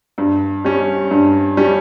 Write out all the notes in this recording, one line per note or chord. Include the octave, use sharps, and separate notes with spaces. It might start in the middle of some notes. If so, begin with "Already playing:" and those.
G2
G3 C#4
G2
G3 C#4